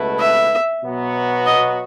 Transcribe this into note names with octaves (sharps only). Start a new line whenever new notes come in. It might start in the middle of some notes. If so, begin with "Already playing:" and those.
Already playing: C#2 B2 A3 E4 B4
E5
B2 F#3 B3 F#4
D#5